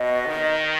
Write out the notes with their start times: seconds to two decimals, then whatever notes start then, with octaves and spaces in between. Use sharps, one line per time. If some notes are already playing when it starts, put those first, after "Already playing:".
Already playing: B2 D#5
0.26 D#3